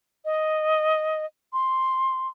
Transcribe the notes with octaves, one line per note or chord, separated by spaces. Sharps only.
D#5
C6